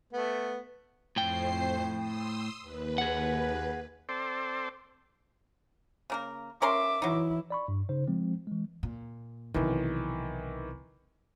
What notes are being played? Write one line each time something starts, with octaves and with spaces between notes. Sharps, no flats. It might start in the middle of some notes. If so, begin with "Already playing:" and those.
A3 B3
F2 A2 C5 G5 C7
C6 D#6 E6
D#2 B4
G#4 F#5
C4 A4 C5 D5
C#3 A#3 A#4
C#4 A#4 E5 C6 D6
E3 F#3 D#4 E4
D5 B5 C#6
G2
C#3 D#4 C5
F3 G#3 C4
E3 G#3
A#2
B1 C3 D#3 E3